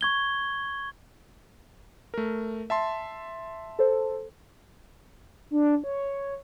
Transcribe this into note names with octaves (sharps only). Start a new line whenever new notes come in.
C#6 G#6 G7
A3 A#4
E5 A5 C6
A4 C5
D4
C#5